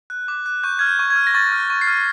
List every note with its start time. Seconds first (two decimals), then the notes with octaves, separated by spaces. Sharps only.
0.10 F#6
0.28 D6
0.46 F#6
0.63 C#6 G6
0.79 F6 G#6
0.87 G6
0.99 C#6
1.10 G#6
1.16 F6
1.27 A#6
1.34 C#6 A6
1.52 F6
1.70 C#6
1.81 C7
1.87 F6